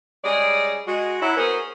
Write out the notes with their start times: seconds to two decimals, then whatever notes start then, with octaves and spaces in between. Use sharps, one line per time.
0.25 G3 G#3 C#4 G#4 D5
0.87 G#3 F#4
1.22 F#3 E4
1.37 B3 C#4 F#4 G#4 A#4 C5